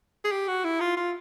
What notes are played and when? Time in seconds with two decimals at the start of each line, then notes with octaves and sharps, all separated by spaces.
0.24 G#4
0.31 G4
0.48 F#4
0.64 E4
0.80 F4
0.97 F4